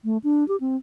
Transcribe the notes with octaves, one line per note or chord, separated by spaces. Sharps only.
A3
D4
G4
C4